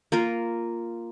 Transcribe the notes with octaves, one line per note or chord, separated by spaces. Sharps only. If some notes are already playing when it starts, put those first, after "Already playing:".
A#3 F4 A#4